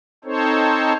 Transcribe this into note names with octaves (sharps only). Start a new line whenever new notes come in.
C4 D#4 A4 C5 C#5